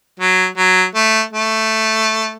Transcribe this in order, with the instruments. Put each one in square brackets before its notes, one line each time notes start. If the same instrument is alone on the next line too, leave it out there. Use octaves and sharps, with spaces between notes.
[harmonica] F#3
F#3
A3
A3